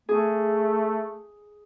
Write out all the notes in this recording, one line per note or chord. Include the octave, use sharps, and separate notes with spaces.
A3 G#4